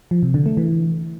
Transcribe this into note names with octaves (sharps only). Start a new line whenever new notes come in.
F3
C3
D3
A3
E3